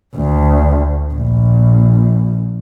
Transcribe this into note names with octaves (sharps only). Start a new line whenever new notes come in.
D2
A#1